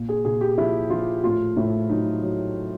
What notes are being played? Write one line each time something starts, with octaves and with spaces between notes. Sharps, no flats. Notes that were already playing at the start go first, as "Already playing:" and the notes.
Already playing: A#2
G#4
A#2 G#4
G4
F3 E4
F3 F4
A2 F4
A2 E4
F#3 D#4
F#3